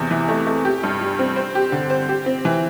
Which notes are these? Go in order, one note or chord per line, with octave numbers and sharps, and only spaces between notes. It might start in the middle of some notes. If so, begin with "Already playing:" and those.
Already playing: E2 C3
E3
A3
A3
G4
G2
G3
C4
C5
G4
D3
C5
G4
C4
E3